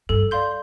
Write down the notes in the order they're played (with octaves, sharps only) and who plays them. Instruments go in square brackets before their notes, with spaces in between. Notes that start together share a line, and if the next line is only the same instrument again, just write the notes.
[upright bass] G2 [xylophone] A4
[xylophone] D5 F5 C6 G6